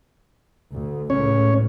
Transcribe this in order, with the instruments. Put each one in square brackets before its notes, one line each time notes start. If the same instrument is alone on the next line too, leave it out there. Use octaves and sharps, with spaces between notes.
[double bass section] D2
[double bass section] C#2 A2 [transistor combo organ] C#4 C#5